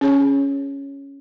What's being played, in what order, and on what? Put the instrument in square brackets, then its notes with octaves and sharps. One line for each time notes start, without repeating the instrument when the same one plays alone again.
[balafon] C#4 G#4 C#5